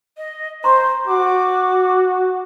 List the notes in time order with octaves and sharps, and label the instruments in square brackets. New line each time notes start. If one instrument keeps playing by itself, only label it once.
[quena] D#5
[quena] C5 [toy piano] A#5 C6 C#6
[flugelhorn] F#4 [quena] D6